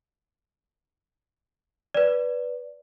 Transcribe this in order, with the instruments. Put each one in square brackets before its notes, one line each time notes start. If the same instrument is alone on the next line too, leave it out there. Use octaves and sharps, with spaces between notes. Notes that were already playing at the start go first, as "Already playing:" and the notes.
[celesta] B4 D5